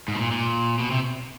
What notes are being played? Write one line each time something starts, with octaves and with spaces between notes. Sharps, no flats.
G#2
B2
A#2
A#2
B2
C3